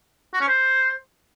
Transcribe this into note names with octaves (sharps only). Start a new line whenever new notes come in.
F#4
C#4
C5